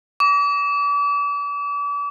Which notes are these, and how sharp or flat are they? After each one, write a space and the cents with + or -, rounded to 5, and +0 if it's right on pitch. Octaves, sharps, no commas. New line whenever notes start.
D6 -40